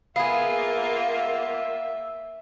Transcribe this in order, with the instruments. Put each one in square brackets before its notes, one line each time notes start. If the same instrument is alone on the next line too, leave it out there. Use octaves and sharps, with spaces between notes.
[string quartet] A#3 F4 [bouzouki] B3 G#4 [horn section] E5 [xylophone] F5